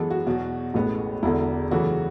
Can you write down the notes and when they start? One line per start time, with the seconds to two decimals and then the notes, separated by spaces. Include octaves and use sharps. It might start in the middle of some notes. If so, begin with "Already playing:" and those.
Already playing: F#2 E3 G#3 B3 G#4 A4
0.11 F#4
0.26 E2 B2 F#3
0.74 A1 A2 G#3 B3
1.23 E1 E2 D3 E4
1.71 F#2 C#3 E3 A3 F#4